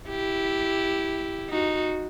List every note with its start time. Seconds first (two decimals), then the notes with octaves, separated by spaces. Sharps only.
0.09 E4 G4
1.49 D#4 F#4